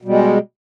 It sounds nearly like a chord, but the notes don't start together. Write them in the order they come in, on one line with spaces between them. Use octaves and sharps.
B2 G3 G#3